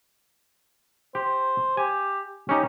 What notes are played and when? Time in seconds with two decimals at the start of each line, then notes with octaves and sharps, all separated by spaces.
1.15 G4 C5
1.77 G4 G#5
2.49 C#4 D#4 G4